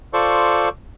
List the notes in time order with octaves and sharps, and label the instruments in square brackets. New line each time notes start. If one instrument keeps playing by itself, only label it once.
[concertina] F4 A4 C5 D5 C#6